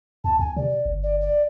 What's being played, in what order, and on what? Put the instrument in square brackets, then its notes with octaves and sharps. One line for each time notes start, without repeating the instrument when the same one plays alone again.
[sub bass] D#2 [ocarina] A5
[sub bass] D#2 [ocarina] G#5
[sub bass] C3 [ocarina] D5
[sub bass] G1
[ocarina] D5
D5